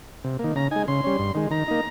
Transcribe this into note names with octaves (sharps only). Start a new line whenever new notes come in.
C3
D#3 A#3
C#3 A#5
G#3 D#4 G#5
C#3 C6
G3 C#4
G2
D#3 G#3
D#3 A#5
A#3 D#4